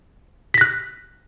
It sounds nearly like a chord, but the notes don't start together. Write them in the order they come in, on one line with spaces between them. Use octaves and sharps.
B6 A#6 F#6